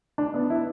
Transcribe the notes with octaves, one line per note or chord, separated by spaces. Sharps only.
D4
B3
E4